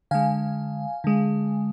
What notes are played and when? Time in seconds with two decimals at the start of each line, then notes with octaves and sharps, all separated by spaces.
0.11 D3 G#3 F5 G#5
1.04 D3 G#3